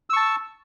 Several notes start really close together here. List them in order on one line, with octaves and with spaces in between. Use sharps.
E6 C#6 A5